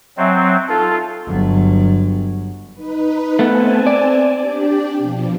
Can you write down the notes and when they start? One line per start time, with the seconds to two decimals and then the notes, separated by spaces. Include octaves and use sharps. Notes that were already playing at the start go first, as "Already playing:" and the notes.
0.17 F#3 C4 D#5 E5 G#5
0.69 D#4 F4 A4
1.26 G1 F#3
2.75 D#4 B4
3.39 A3 B3 C4 G#5 A5
3.87 D5
4.40 D4 G4
4.98 B2 F3